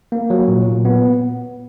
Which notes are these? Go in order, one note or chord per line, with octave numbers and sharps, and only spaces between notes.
A#3
F#3
A#2
A#2
B3